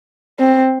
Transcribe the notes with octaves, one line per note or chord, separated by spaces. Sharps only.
C4